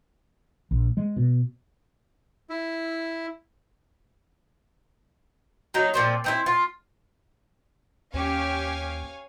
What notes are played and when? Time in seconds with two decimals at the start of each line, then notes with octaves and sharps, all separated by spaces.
0.71 A#1
0.97 G#3
1.17 B2
2.50 E4
5.74 F#3 D#4
5.94 A#2 F3 C4
6.24 C4 D#4 E4
6.46 F4
8.14 D#2 C#4 G4 C#5 F5 G#5